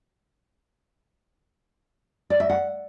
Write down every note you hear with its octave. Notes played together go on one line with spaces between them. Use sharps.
D5
E5
F#5